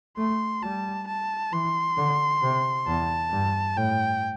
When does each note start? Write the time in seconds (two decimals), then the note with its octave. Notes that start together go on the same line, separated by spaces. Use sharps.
0.17 A3 C6
0.62 G3 A5
1.08 A5
1.52 E3 C6
1.97 D3
2.42 C3
2.87 E2 A5
3.33 G2
3.77 A2 G5